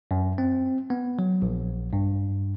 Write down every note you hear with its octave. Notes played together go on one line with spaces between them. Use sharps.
F#2
C4
B3
F#3
A#1
G2